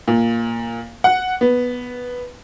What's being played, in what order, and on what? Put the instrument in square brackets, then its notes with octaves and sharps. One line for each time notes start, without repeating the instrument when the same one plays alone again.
[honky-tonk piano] A#2
F#5
B3